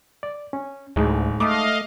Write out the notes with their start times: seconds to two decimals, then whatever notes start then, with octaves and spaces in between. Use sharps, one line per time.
0.23 D5
0.53 C#4
0.96 D1 D2 G#3 D#4 C#5
1.40 A3 D#5 F5 D6 D#6